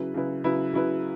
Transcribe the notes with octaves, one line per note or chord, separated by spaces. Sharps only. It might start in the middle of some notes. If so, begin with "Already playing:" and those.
Already playing: C#3 F#3 E4 B4
C#3 F#3 E4 B4
C#3 F#3 E4 B4
C#3 F#3 E4 B4